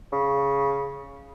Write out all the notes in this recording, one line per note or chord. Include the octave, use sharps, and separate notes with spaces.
C#3